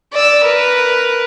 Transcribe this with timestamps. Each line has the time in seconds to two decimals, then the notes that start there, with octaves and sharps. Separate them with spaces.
0.12 D5 E6
0.43 A#4 B4